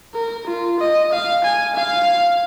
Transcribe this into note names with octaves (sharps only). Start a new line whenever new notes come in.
A#4
F4
D#5
F5
G#5
F5